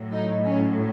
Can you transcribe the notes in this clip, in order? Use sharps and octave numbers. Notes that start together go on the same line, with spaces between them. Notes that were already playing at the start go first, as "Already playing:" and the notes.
Already playing: A2 F#3
D#4
C#4